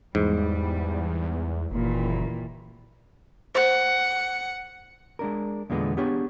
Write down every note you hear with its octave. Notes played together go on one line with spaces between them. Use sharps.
E2 G#2 G3
F#1 D#2 A#2 E3
C5 F#5
G#3 D4 A#4
E2 A#2 D3 G#3 B3
B3 D4 G4 G#4 C#5